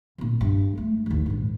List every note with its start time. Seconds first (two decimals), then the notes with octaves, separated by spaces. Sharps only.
0.18 C2 A#2
0.41 G2
0.76 G#3 A3
1.06 A1 D#2
1.26 A#1 G#2